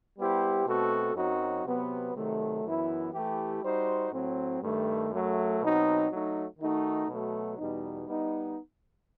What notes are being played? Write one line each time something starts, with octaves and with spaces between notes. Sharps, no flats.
G3 B3 E4 G4 C5
B2 A3 C4 F#4 A4
F#2 F#3 C4 D#4 F#4
C3 F#3 B3
C3 D#3 F#3 A3
F#2 E3 B3 E4
E3 A3 E4 G4
G3 D#4 F#4 C5
A2 F#3 C4
G2 D#3 A3
F#2 F#3 A3
B2 F#3 C4 D#4 F#4
F#3 A3 D#4
D#3 A3 D#4 F#4
B2 F#3 A3
E2 B2 G3 D#4
G3 B3 D#4